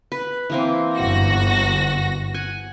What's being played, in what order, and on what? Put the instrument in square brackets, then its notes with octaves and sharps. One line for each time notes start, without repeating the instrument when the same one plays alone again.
[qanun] B4
E3 A#3 C4
[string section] G1 F#4 A#6
[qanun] F#5 G#5